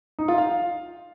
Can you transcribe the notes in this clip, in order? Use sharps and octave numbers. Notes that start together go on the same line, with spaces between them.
D#4
F4
F5